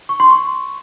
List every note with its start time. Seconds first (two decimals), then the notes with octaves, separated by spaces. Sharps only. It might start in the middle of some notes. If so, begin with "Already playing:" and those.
0.09 C#6
0.20 C6
0.30 C#6